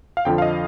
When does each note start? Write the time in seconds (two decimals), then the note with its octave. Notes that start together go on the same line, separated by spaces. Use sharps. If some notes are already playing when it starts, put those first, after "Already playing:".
0.17 F5
0.25 F2 D3 F3 G5
0.38 F5
0.42 D#5